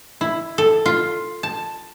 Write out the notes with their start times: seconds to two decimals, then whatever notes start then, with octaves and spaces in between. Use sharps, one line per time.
0.21 E4
0.58 A4
0.86 F4
1.43 A5